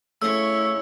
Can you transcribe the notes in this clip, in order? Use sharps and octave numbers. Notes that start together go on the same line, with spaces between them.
C#3 A3 E4 C#5 E6